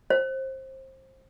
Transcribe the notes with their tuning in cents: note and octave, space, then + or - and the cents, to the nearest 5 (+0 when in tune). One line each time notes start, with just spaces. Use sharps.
C5 +25